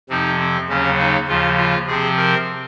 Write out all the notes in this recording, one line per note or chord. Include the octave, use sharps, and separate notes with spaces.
F2 C3 F3 C4 D#4
C4
D#2 C#3 F#3 C#4
D#4
D#2 C#3 F3 F4
F4
C3 F3 C4 G#4
A#4